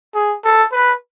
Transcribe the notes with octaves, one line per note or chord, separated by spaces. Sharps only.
G#4
A4
B4